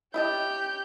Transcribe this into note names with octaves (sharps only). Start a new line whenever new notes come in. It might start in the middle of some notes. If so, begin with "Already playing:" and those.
C#4 E4 G4 D#5 A5 G6